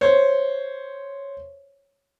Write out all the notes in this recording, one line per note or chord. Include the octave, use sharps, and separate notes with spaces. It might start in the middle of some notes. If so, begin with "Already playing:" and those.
C5 C#5